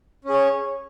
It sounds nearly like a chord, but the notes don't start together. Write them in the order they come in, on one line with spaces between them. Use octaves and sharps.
C#4 G#4 C#5